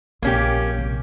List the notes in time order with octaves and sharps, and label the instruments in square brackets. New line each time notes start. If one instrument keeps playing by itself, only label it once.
[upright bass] A#1 [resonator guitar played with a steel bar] A#3 C#4 G4
[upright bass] C3